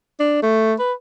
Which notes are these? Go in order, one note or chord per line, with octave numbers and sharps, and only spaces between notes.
D4
A3
B4